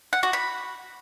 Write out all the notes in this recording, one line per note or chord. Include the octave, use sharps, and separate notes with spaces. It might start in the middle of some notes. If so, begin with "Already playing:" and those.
F#5
F#4
B5